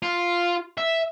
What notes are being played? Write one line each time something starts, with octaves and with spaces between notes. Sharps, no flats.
F4
E5